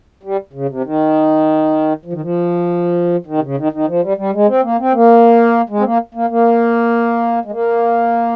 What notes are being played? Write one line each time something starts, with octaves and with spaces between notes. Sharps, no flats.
G3
C#3
C3
D#3
F3
D#3
F3
D#3
C3
C#3
D#3
D#3
F3
G3
G3
G#3
C4
A#3
C4
A#3
G#3
C4
A#3
A#3
A#3
G#3
A#3